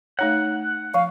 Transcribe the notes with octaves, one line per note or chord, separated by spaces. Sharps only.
A3 D#4 C#5 F#5
F3 F5